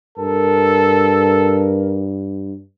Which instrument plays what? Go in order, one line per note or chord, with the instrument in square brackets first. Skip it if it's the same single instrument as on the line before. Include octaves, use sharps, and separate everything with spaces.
[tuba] G2 [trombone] A4 [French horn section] A#4